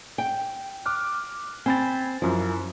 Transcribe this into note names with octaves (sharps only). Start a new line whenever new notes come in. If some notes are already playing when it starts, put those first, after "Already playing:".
G5
D6 F6 F#6
C4 G#5 B5 A6
F#2 F3 E4